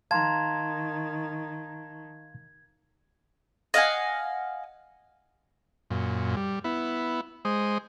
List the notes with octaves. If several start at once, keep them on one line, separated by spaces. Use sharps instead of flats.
D#3 F5 A5 A#5 C6 G#6
D#5 F5 F#5 G#5
F#2 A#2
G3
B3 E4
G#3 C5 D#6